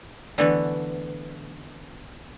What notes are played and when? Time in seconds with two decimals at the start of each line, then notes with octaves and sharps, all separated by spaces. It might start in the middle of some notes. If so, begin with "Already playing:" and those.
0.38 D3 E3 A3 B3